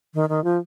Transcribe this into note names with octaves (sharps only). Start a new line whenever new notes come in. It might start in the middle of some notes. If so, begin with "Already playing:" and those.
D#3
D#3
F3